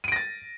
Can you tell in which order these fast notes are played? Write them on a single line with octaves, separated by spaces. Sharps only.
D#7 D7 A#6 A6